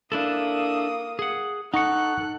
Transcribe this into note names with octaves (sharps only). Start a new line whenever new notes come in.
A#3 D4 E4 A4 D#6
G#4 F#5
D#4 A4 F#5 C#6 F#6 C#7